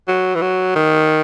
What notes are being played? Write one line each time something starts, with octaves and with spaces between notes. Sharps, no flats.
F#3
E3
F#3
D#3